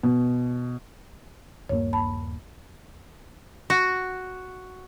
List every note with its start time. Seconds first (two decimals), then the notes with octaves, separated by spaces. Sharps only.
0.03 B2
1.69 D#1 G2 A#3 C#5
1.93 A5 B5
3.70 F#4